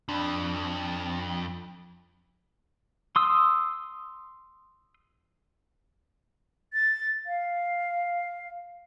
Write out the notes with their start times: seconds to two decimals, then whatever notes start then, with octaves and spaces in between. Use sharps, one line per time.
0.09 F2 D4 B5
3.16 C6 D#6 E6
6.73 A6
7.26 F5